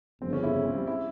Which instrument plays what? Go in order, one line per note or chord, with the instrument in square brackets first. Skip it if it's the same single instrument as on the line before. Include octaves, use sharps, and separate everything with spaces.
[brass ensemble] G1 F2 C#3 [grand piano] C4
[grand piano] C#4
E4
C4
G3
E4